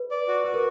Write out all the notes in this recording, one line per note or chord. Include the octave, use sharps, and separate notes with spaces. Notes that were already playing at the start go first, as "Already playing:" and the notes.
Already playing: B4
D5
F#4
F#4 B4
A#4